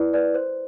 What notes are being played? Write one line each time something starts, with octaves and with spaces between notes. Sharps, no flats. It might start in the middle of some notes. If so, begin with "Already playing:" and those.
Already playing: E4 B4 D5
B4 D5
C5